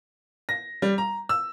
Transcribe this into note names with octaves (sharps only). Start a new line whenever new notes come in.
A#6
G3
A#5
E6